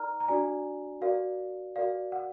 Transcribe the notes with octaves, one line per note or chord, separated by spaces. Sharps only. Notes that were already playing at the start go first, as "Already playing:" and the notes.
Already playing: D#4 A#4 D5 A#5 F6
A#5
D4 F#4 D5 G#5
F#4 A#4 D5 F5
F#4 A#4 D5 F5
F#5